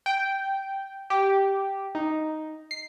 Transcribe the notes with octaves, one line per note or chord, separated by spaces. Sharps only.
G5
G4
D#4
C7